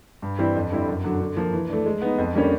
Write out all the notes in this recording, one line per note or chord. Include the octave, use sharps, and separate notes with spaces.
G2
E3 G3 C4 E4
F2
D3 G3 C4 E4
F#2
D3 F#3
D3
F3 A#3
E3
A3 D4
G#3
B3 D#4
F2
D3 G3 A#3 C#4